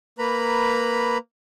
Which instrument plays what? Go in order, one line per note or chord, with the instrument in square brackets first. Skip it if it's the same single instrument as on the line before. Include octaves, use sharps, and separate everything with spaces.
[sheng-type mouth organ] A#3 B4 A#5 B5